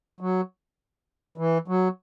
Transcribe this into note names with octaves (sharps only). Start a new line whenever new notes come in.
F#3
E3
F#3